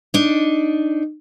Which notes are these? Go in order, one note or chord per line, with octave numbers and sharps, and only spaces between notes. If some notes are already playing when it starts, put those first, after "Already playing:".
D4 D#4